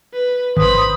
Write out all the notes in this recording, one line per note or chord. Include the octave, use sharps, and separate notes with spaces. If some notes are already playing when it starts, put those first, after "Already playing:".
B4
G#1 B4 C5 B5 D#6